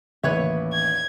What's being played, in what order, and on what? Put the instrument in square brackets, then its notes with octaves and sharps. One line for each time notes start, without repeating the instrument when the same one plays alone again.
[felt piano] A1 D#2 [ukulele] B4 C#5 E5
[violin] G#6